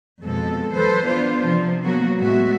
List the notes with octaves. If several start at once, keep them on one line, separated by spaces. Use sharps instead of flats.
F2 B2 F3 G#3 A4
E3 F#3 A4 B4 C5
B3 D4 F4 C5
C3 F3
F#3 A#3 B3 F#4
A2 G#3 B3 F#4 E5